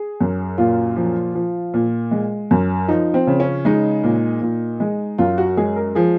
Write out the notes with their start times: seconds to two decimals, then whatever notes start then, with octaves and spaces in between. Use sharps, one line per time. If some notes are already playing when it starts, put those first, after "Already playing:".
Already playing: G#4
0.21 F#2
0.58 A#2 F4
0.96 F3
1.35 F3
1.74 A#2
2.11 G#3
2.51 F#2
2.88 F3 D#4
3.14 C4
3.27 C#3
3.40 C#4
3.65 G#3 D#4
4.03 A#2
4.42 A#2
4.80 G#3
5.18 F#2 F4
5.38 F#4
5.57 G#3 G#4
5.76 A#4
5.95 F3 G#4